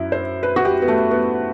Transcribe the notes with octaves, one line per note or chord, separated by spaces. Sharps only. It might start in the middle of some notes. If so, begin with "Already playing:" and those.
Already playing: F#2 E4
C5
B4
F#4
G4
B3
A3
B3